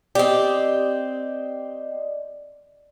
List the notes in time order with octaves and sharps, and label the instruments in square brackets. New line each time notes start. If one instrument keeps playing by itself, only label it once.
[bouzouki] C4 G4 [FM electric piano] D5 D#5